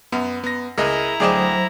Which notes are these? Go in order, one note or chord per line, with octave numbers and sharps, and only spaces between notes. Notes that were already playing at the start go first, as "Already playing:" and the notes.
F#2 B3
B3 A#6
C#2 E4 G#4 A#4 D#5 A#5
D2 F#3 G#4 C5 D5 D#5 G5 E7